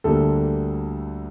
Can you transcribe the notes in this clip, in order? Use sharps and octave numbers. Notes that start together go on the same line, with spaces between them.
D2 D3 G3 A#3 A4